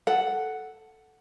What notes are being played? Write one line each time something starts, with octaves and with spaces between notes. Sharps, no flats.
A4 F#5